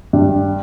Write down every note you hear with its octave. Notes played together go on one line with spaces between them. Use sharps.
G2 G3